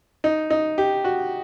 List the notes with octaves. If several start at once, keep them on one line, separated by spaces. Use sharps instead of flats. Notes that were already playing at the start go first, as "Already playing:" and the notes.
D#4
D#4
G4
F#4